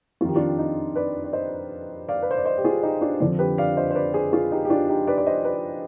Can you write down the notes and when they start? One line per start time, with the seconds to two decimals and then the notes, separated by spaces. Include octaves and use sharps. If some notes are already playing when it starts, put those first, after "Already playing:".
0.21 F2 F4
0.25 D#3 G4
0.36 D4 F4
0.58 D#4
0.96 B4 D5
1.24 D5
1.33 C5 D#5
2.09 D5 F5
2.22 B4
2.31 C5
2.38 D5
2.45 C5 D#5
2.58 G4
2.64 F4 G#4
2.83 D#4 G4
3.01 D4 F4
3.20 F2 D3 F3 D4
3.39 G4 B4
3.58 D5 F5
3.77 C5 D#5
3.91 C5
3.95 B4 D5
4.14 G#4 C5
4.32 F4 G#4
4.51 D#4 G4
4.65 G4
4.70 D4 F4
4.89 D#4 G4
5.07 B4 D5
5.18 D5
5.27 C5 D#5
5.45 B4 D5